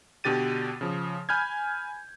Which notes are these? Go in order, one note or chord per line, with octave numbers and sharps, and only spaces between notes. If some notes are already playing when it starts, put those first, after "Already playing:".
B2 D3 G4 A6 D#7
C#3 F3
G#5 B5 F6 G6 G#6